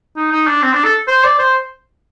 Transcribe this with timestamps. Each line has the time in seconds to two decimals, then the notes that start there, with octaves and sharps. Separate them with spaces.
0.16 D#4
0.32 D#4
0.47 D4
0.62 C4
0.73 D4
0.84 A4
1.08 C5
1.24 D5
1.39 C5